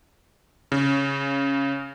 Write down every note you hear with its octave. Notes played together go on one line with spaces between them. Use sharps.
C#3